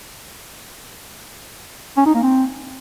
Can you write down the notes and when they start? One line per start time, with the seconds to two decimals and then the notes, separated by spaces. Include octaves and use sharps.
1.97 C#4
2.06 D#4
2.15 A#3
2.23 C4